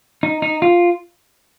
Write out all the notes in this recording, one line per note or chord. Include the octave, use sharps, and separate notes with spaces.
D#4
D#4
F4